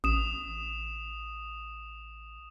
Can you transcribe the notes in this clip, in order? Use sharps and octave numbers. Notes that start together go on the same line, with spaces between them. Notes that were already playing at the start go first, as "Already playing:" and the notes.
A1 D#6 E7